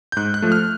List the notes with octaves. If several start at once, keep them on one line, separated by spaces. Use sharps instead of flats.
G6
G#2 F#6
F#6
F3 A3
F6